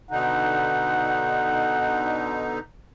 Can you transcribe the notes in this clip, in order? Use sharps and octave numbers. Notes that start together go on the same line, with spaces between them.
B2 D3 D#4 F#5